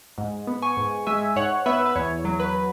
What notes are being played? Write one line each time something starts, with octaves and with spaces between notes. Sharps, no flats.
G#2
B3
G#5 C#6
G#2
G#3 E5 G#5
G#2 C#5 F#5
B3 B4 E5
B4
E2 C#5
F#3
B4